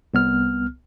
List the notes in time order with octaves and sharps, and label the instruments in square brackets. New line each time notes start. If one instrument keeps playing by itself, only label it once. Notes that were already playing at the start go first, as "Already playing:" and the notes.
[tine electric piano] C2 B3 F6